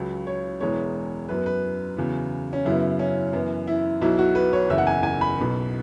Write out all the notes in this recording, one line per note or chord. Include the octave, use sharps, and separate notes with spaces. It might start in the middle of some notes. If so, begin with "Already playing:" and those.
Already playing: C#2 C#3 F#3
C#5
E1 E2 E3 G#3 B3 C#5
F#2 F#3 B3 B4
B4
E2 C#3 F#3 B3
C#4
F#2 C#3 F#3 B3 E4
C#4
F#2 E3 B3
E4
B1 B2 F#3 E4
F#4
B4
C#5
F#1 E2 E3 B3 E5
F#5
G#5
G#5
B5
B1 B2 F#3 B3